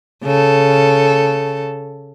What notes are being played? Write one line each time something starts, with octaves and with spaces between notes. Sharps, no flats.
C#3 A4